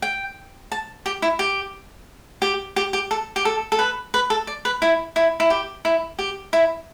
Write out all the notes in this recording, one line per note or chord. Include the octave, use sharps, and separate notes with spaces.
G5
A5
G4
E4
G4
G4
G4
G4
A4
G4
A4
A4
B4
B4
A4
D5
B4
E4
E4
E4
G4
E4
G4
E4